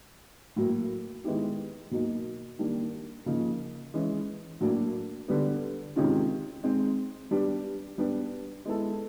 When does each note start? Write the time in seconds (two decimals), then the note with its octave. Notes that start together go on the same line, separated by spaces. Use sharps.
0.56 A2 F#3 A#3
1.24 D#3 G#3 B3 E4 G4
1.91 B2 F#3 A#3 D#4
2.59 D#3 G3 A#3 D4
3.26 C#3 F3 A#3 D#4
3.94 E3 G#3 C#4
4.61 A2 F#3 A#3 D4
5.28 D3 G3 B3
5.96 C3 D#3 G#3 C#4 F4
6.63 G#3 C4 D#4
7.31 G3 B3 D4 G4
7.98 G3 B3 D4 G4
8.65 G#3 B3 E4 A4